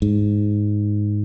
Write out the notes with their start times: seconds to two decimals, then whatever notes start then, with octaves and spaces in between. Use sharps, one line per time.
0.02 G#2